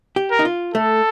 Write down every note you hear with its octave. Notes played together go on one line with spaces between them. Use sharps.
G4
A#4
D#4
F4
A3 A4